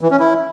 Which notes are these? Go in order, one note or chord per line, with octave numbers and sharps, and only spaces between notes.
E3
C#4
E4